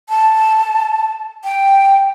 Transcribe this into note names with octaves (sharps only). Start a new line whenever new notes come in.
A5
G5